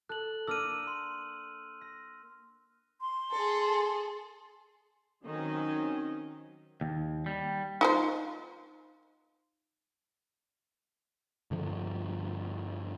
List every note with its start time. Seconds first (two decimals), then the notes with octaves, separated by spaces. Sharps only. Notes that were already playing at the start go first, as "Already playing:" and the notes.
0.09 A4 F#6 F#7
0.47 A#3 D4 A#4 E6 F6 D#7
0.87 C6
1.81 A#6
3.01 C6
3.31 G#4 A4
5.26 D#3 F#3 C4 C#4 D#4 D#5
6.81 D#2
7.26 G3
7.81 D#4 F4 C5
11.51 G2 D3 F3